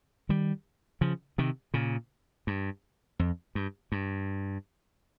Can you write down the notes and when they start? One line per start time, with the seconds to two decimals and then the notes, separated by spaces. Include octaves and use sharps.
0.29 D#3 G3
1.01 C#3 F3
1.38 C3 D#3
1.74 A#2 C#3
2.47 G2
3.19 F2
3.55 G2
3.92 G2